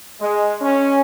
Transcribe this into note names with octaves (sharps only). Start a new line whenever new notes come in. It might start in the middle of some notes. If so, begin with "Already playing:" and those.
G#3
C#4